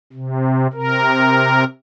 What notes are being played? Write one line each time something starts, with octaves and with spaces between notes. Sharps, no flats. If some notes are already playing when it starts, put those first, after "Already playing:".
C3
C3 A#4